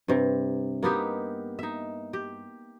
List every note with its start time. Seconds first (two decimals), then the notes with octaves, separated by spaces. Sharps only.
0.08 G2 C3
0.83 A#3 B3 D#4 G4
1.59 D#4 E5
2.13 G4